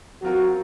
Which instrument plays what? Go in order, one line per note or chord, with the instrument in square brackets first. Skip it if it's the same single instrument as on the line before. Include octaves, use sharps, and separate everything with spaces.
[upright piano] F#3 C4 F4 A#4 [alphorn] F#4